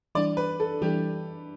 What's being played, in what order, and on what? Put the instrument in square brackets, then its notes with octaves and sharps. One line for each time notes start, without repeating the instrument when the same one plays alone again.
[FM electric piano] E3 G3 D4 [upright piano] D5
[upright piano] B4
A4
[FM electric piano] E3 G3 D4 [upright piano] G4